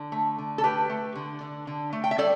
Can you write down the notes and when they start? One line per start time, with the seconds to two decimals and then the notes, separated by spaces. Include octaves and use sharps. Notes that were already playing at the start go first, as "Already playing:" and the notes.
Already playing: D3
0.12 A3
0.38 D3
0.58 A4
0.64 A3 G4 B4
0.90 A3
1.15 D3
1.41 D3
1.67 D3
1.93 A3
2.04 G5
2.11 E5
2.18 G3 A4 D5